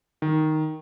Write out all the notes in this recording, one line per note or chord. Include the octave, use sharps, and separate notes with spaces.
D#3